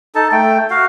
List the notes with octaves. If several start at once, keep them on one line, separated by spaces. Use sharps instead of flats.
D#4 A4 A5
A3 G5
F#4 F5